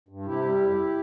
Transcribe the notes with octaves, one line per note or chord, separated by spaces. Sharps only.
G2
C3 E4 G4
G3
F2